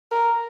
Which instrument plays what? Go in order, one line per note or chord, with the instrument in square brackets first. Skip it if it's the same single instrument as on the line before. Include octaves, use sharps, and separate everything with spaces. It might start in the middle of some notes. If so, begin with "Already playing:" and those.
[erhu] A#4